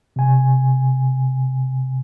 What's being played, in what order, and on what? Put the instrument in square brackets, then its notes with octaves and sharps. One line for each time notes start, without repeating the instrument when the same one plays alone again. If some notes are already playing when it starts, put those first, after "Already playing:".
[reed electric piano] C3 G#5